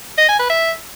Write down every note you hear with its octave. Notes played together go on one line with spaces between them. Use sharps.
D#5
G#5
B4
E5